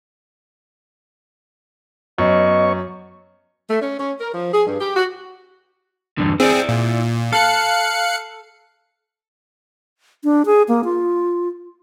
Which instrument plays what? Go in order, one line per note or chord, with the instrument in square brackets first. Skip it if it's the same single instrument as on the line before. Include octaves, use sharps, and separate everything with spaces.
[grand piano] F#2 [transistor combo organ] B3 C#5 C#6 [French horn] D#5
[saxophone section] A3
C#4
C#4
A#4
F3
G#4
G2
G4
F#4
[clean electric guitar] E2 G2 D3
[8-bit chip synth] C4 G#4 [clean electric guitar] E4 D5
[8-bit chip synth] A#2
[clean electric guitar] A4 [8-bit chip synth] F5 F#6 C#7
[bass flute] D4
G#4
A#3
F4